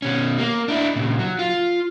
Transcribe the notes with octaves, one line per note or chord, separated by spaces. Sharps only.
B2 C#4
A#3
D4 E4
A#2 C#3
F#3
F4